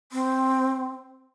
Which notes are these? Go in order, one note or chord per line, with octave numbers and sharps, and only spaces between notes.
C4